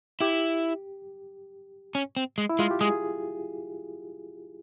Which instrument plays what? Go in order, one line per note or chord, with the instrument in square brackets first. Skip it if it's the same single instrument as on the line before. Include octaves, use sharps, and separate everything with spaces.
[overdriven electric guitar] E4 [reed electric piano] G4
[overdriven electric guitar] C#4
C4
G#3
[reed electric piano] E4
[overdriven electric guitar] G#3 [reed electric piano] F4
[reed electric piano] G4
[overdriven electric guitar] G#3 [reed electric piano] G#4